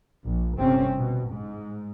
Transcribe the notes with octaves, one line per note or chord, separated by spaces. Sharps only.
A#1
G1 C3 C4 C#4
B2
G#2